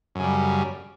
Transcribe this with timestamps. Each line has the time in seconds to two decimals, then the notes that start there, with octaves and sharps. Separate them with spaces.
0.15 F#2
0.20 C#3
0.24 G3